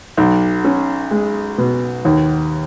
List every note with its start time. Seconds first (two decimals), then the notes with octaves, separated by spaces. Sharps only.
0.17 B1
0.64 C#4
1.11 G#3
1.58 B2
2.05 D#2